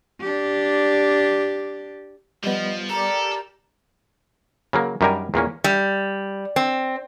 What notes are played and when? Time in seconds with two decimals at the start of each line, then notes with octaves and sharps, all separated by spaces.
0.20 D4 G4
2.44 F3 G3 B3 D#5
2.90 G4 A4 A#4 D5 A#5
4.73 C#3 F#3 A#3
5.01 F#2 D#3 G3 D4 A#4 G#5
5.34 E2 A#2 A#3 C#4
5.64 G3
6.56 C4